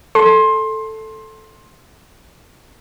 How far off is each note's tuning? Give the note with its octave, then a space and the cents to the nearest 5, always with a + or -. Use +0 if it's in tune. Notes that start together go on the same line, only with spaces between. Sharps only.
A4 +0 C6 +20